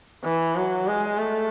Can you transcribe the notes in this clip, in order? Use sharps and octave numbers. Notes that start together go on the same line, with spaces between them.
E3
F#3
G#3
A3